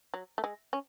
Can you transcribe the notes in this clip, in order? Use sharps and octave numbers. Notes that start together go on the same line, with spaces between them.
F#3
A3
G#3
C#4